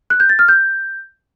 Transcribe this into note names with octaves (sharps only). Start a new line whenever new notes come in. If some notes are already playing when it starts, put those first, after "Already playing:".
F#6
G6
A6
F6
G6